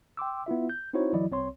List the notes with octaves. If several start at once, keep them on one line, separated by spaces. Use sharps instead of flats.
G5 C6 D6 E6
B3 E4 F4 E5
G6
C4 D#4 E4 F#4 C5 C#5
G1 E3 F#3 E4 D5 D#5
C2 C4 C#5 C6